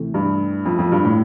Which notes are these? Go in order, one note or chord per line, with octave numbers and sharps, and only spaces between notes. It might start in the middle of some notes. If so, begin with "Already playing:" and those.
Already playing: C3 E3 A3
G2
F2
F2
G2
A2